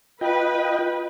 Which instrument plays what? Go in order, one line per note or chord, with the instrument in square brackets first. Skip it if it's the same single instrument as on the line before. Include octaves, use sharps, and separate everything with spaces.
[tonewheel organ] F4 D#5 G5 [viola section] B4